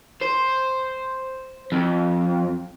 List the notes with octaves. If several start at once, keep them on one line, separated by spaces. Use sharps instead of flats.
C5
F2